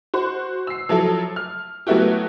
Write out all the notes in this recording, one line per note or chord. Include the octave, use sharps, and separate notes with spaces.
F#4 C5
E6 C7
F3 F#3 E4 A4
F6
F#3 A3 B3 E4 F#4 G4